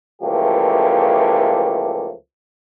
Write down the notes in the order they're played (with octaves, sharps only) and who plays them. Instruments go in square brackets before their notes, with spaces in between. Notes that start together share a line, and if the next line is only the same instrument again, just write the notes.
[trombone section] C#2 E3 F3 A3 A#3 G4